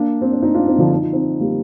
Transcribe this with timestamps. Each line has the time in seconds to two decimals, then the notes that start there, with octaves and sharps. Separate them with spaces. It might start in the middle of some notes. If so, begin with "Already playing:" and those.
Already playing: A#3 D4
0.21 C4
0.32 D4
0.42 C4 D#4
0.54 D4 F4
0.67 C4 D#4
0.78 D3 F3
0.91 D#4
1.02 F4
1.13 C4 D#4
1.40 G3 A#3